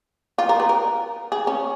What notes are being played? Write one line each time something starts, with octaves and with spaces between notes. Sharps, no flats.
F4
A#4
B4
A#4
G#4
C#4